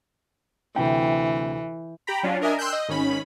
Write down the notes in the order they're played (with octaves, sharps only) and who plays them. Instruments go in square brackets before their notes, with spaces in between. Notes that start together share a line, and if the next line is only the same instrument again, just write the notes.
[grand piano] D2 C3 G5 [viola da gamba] E3
[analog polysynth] G4 G5 A#5 B5
F#3 C#4 D4 F4
D4 A#4 D#5 E5 G#5
G5 C6 E6 F#6 G6
D#5
G#1 D#3 C#4 B5